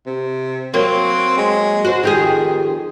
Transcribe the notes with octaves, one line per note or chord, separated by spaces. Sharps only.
C3
F#3 A#3 C4
G#3
F#4 C5
F2 D#3 G4 G#4